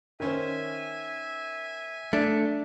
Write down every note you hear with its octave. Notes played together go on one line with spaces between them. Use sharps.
D#3 C#4 C5 E5 G#5
A3 D4